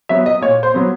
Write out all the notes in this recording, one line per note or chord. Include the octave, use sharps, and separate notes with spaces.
F#3 B3 E5
D#5
A#2 C#5
C5
F#3 B3